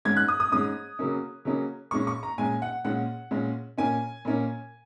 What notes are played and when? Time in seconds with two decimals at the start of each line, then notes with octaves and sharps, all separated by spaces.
0.05 G#2 G#3 C#4 G#6
0.17 F#6
0.28 D#6
0.40 D#6
0.52 G#2 G#3 C#4 D#6
0.99 C#3 F#3 A#3 C#4
1.45 C#3 F#3 A#3 C#4
1.91 A#2 G#3 C#4 C#6
2.07 C#6
2.23 A#5
2.38 A#2 G#3 C#4 G#5
2.62 F#5
2.85 A#2 G#3 C#4 F#5
3.31 A#2 G#3 C#4
3.78 A#2 A#3 C#4 G#5
4.25 A#2 A#3 C#4